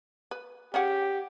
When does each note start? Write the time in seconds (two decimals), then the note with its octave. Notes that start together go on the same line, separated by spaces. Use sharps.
0.31 B4
0.74 C#4 G4 G#4 F#5